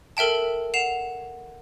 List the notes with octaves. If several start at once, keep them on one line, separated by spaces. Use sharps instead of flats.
A4 A#4 E5 G5 A5
F#5 C7 E7 F7